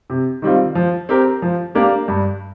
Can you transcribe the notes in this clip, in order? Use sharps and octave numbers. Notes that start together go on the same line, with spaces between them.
C3
D#3 G3 C4 F4
F3
C4 G4 A#4
F3
A#3 D4 G4 A#4
G2